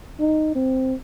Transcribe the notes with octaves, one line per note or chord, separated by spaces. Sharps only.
D#4
C4